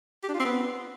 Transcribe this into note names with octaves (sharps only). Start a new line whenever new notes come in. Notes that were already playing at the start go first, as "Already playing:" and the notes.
G4
D4
F4
C4
B3